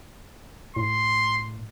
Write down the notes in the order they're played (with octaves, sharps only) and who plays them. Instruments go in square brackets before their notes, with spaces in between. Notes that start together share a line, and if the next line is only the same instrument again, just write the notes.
[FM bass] A2 [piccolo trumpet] C6